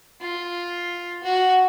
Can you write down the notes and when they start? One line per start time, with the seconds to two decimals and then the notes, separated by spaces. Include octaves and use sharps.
0.21 F4
1.24 F#4